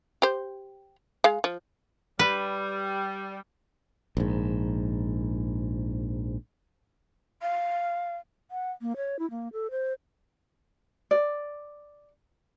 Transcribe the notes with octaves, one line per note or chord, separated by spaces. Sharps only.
G4 C5
G#3 F5
F3
G3 B4
A#1 G#2
F5
F#5
A#3
C#5
E4
A#3
A4
C5
D5